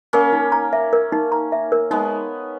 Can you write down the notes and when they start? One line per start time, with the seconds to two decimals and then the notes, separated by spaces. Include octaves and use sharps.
0.13 A#3 C#4 A#4
0.33 D#4
0.52 A#5
0.73 E5
0.93 A#4
1.12 D#4
1.32 A#5
1.52 E5
1.72 A#4
1.91 G#3 B3 D#4